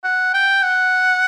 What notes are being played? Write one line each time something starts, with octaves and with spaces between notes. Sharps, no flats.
F#5
G5
F#5